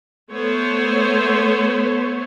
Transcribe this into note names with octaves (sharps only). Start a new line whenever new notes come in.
A3 B3 A4 C5 C#5